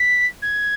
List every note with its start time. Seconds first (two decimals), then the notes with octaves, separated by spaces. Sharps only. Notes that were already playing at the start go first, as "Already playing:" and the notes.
Already playing: B6
0.42 G#6